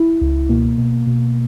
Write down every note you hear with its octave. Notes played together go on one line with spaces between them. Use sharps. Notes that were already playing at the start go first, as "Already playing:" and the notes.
Already playing: E4
C#2
B2 A#3
B2
B2